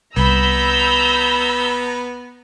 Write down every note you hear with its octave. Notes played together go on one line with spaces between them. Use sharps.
C2 B3 A#5 B5 E6 G6